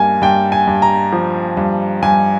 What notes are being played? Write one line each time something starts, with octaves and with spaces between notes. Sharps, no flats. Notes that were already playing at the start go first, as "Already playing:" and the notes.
Already playing: G2 A#3 G#5
G2 G5
G#5
G2
A#5
F3
G2
G2 G#5